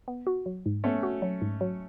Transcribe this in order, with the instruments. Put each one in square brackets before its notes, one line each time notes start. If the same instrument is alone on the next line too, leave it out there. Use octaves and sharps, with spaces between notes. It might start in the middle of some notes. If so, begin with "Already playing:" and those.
[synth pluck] B3
F#4
F#3
G#2
[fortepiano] A3 C#4 [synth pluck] B3
[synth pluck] F#4
F#3
G#2
F#3